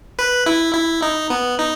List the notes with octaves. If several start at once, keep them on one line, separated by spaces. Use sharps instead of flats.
B4
E4
E4
D#4
B3
D#4